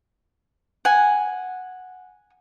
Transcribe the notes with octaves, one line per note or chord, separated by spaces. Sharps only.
F#5 G#5